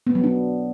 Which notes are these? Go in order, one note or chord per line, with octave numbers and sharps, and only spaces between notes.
B3
F#3
D4